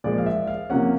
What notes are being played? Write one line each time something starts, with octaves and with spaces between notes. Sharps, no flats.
A#2 F3 G#3 D5
F5
E5
F5
C3 F3 A#3 C#4 F#5